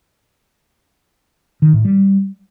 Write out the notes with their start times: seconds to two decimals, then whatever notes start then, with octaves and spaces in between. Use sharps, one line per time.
1.62 D#3
1.73 A2
1.85 G3